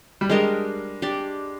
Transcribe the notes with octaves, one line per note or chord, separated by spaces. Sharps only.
G3
G#3 D4 G4 A#4 D#5
D4 G4 D5